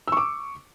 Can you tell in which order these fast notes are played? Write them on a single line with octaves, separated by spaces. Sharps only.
E6 C#6 D6